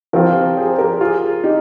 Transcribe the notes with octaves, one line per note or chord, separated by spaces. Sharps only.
F3 C4 F4 G4 A#4
G#4 C5
G4 A#4
F4 G#4
D#4 G4